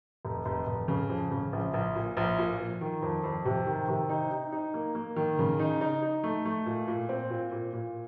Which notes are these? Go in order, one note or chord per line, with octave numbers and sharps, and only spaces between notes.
F1
F1
F1
C#3
F2
C#3
A#1
A#1
A#2
A#1
A#2
F3
D#3
F2
F2
C3
D#3
C3
D#4
D#4
D#4
A#3
A#3
D#3
C#3
D#4
D#4
D#4
A3
A3
A#2
A#2
C4
A#2
A#2
A#2